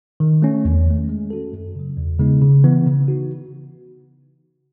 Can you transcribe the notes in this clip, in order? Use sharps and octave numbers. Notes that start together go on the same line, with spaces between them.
D#3
A3 C#4
E2
D#3 A3
G#3
C#4 F#4 A4
F#2
C#3 F#3
E2
C#3 G#3 B3 D#4
C#3
E3 B3
C#3
D#4 F#4